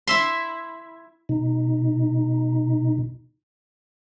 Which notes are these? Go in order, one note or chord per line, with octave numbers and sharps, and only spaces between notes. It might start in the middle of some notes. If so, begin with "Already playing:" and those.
E4 E5 C6
B2 D#4